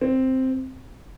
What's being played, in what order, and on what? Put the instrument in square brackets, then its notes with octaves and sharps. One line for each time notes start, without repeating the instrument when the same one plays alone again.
[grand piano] C4